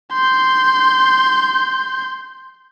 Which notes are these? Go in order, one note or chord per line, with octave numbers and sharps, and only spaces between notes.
C6 G6